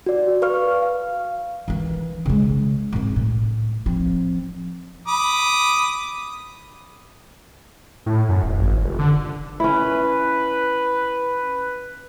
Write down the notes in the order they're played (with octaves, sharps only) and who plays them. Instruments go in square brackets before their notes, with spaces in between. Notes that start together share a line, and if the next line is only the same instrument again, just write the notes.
[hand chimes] F#4 D5
B4 F5 C#6 F6
F5
[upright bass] D#3 E3
C#3 G#3
G#1 G#2
A2
F3 C4
[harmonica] B5 D6 D#6
[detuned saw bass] A2
F#2
D#1
G#1
F1
D3
[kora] C#4 E4 [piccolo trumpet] B4